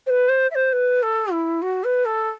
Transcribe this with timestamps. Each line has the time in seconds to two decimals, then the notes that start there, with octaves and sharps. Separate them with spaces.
0.06 C5
0.10 B4
0.29 C5
0.51 E5
0.55 C5
0.72 B4
1.03 A4
1.32 E4
1.62 F#4
1.84 B4
2.05 A4